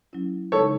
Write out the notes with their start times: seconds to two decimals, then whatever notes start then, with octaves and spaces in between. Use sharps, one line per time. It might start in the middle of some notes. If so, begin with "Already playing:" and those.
0.13 F#3 C#4 E4
0.52 D#4 A4 C#5
0.55 C#3 G#3